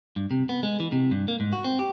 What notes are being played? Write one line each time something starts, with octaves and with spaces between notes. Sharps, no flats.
G2
C3
B3
G#3
E3
C3
G2
A#3
G#2
F#4
C4
G4